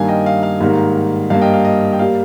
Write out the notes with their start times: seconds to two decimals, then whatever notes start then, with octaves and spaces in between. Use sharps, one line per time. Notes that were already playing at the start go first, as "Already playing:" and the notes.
Already playing: G2 D#3 G3 A#3 F5 G#5
0.08 D#5 G5
0.26 F5
0.43 F5
0.61 G#2 D#3 G3 A#3
1.30 G2 G3 A#3 F5
1.41 D#5 G5
1.53 F5
1.65 D#5
1.93 G5
1.99 G3 A#3 F5